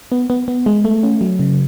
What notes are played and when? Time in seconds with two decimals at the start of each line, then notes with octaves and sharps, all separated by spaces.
0.12 B3
0.30 B3
0.48 B3
0.66 G#3
0.85 A3
1.03 C#4
1.21 F#3
1.39 C#3